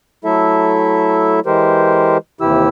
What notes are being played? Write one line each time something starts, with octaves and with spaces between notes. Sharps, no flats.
F#3 A3 E4 A4 E5
E3 G#3 G4 A#4 C5
D#2 C3 E3 E4 G4 E6